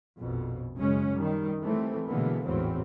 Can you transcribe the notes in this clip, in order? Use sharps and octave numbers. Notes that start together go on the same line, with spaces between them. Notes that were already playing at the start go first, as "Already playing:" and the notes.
A#1 F2 B2
F#1 C#3 G#3 C#4
D#3 G3
E3 G3 A3 C4
B2 D3 E3 G#3 A#3 B3
G#1 E2 A2 E3 F#3 C4